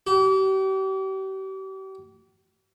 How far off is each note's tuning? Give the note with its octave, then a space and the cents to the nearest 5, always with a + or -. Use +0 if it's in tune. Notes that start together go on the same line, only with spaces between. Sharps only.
G4 -40